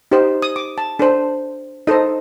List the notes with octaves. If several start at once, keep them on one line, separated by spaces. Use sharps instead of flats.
D#4 G4 C5
D#6
D6
A5
D4 A4 C5
D#4 A4 C5 D#5